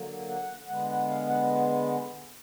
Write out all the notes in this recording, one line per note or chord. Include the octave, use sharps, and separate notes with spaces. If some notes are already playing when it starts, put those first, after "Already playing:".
Already playing: D3 F#3 A#3
F#5
D3 G#3 B3 F#5
F#5
F5
F#5